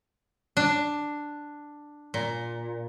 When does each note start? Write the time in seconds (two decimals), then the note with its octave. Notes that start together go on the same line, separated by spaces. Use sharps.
0.57 D4
2.14 A#2